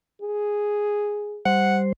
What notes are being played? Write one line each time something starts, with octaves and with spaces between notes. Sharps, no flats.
G#4
G3 C5 F#5